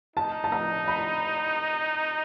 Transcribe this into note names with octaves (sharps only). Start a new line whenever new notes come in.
D#4 A5
A5
A#5
B5